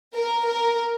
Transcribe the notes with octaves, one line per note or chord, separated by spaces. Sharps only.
A#4
A#4